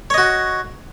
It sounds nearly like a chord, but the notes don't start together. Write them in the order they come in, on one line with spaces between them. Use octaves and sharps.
C#5 D#5 F#4